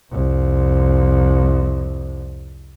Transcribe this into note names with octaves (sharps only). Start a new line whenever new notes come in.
C2 F2